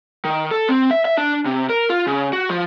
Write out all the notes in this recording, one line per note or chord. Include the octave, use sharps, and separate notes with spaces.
D#3
A4
C4
E5
E5
D4
C3
A#4
F4
C#3
F#4
F3